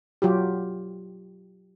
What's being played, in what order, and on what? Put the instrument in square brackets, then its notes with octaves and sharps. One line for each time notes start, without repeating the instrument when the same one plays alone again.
[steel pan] F#3 F4 G4